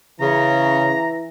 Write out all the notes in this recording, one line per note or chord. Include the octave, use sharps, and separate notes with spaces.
C#3 E3 A#5